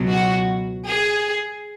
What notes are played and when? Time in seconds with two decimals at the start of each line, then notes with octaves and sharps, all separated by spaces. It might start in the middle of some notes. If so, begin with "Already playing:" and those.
Already playing: C#2 B2 F#3
0.10 F#4
0.86 G#4